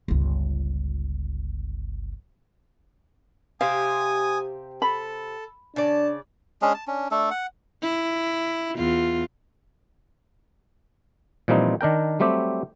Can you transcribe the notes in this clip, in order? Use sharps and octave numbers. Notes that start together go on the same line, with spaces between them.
G1 C#2
C3 G4 C5 F5 G#5 D#6
A4 B5
C#3 D4 D5 A5
G#3 C#4 D4 G#4
A5
C#4 D4
A3 D4 A4
F#5
E4
E2 F4
A#2 E3 F3 G3 C4 D#4
D#3 D4 A#4 G5
F#3 G3 A3 C4 G4